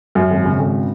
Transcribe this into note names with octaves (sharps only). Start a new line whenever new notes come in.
F#2
G#1
C#3
G#1